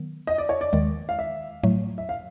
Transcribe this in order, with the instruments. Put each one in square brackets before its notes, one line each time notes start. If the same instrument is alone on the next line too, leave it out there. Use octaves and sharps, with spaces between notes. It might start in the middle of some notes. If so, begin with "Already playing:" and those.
Already playing: [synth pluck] D#3 F#3 B3
[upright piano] D#5
D5
C#5
D5
[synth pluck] D#2 D#3 G#3
[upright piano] F5
E5
[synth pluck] A2 F#3 A3
[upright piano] E5
F5